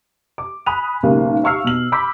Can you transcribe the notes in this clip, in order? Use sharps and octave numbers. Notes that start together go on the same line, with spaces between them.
D6
G#5 B5 D#6 F#6 D#7 F7
B1 G#2 C#3 A#3 G4
E5 F5 C#6 E6 F6 C7
B2 F#7
B5 C6 D6 E6 G6 B6